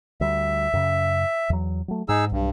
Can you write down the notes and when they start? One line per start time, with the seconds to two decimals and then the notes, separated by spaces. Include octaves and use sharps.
0.21 D2 G3 E5
0.73 F#2 C#3
1.50 E2 F#3
1.88 F#3 A3
2.09 G#2 D#4 G#4 E6
2.32 B1 G2